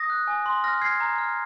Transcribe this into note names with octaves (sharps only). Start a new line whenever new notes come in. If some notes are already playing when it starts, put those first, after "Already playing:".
Already playing: D#6 A#6
F#6
G#5
C6
F6 A#6
F6 G#6 C7
A#5
F6